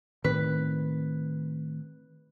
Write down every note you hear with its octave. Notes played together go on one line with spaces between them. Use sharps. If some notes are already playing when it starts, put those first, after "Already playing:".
A2 D#3 C4 B4